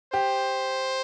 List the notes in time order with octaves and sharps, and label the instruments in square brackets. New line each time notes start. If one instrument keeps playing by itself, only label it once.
[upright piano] G4 [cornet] C5